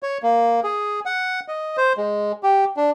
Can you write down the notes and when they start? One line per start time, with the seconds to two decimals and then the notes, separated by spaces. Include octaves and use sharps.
0.03 C#5
0.23 A#3
0.64 G#4
1.06 F#5
1.48 D#5
1.77 C5
1.97 G#3
2.43 G4
2.77 D4